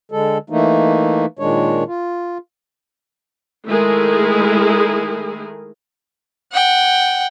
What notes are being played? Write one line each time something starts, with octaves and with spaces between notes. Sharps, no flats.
D3 G#3 A4
E3 A3 A#3 D#4
A#2 D#3 G#3 D4 C#5
F4
D#3 G#3 A3 E4 G#4 A#4
F#5 G5